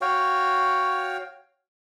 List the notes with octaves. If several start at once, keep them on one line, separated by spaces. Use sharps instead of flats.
F#4 C#5 F5 G5